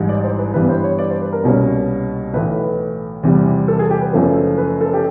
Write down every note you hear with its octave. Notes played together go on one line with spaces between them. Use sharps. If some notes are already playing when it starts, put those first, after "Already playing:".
Already playing: A1 G#2 E3 G3
D5
C5
B4
G2 E3 G3 B3 B4
C5
C#5
D5
C5
B4
A#4
C2 B2 G3 A#3 C#4
B1 A2 E3 B4
E2 C3 E3 G3
A4
G#4
G4
B4
F#1 F#2 C#3 F3 A3
B4
A4
G4